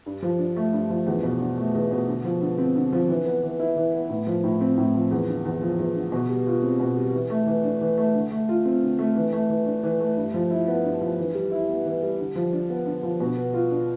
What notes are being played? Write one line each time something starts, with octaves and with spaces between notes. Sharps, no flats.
G2
F3
D4
A3
G2
F3
E2
B2
D4
A3
E2
B2
D3
F3
D3
C4
D3
F3
E3
B3
E3
E4
E3
B3
A2
F3
A2
C4
A2
F3
E2
D3
E2
F3
E2
D3
B2
G3
F4
C4
B2
G3
E3
A3
E3
D4
E3
A3
D3
A3
F4
C4
D3
A3
E3
A3
E3
D4
E3
A3
G2
F3
E4
B3
G2
F3
E3
G3
E4
B3
E3
G3
D3
F3
D4
B3
D3
F3
B2
B3
F4
D4